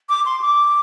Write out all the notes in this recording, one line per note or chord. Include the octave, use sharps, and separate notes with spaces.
D6
C6
D6